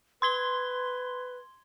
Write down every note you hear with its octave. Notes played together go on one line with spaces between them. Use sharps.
B4 C6 G#6 G7